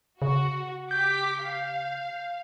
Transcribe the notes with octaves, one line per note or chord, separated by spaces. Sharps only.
C#3 F#4
G4 D6 G6 B6
F5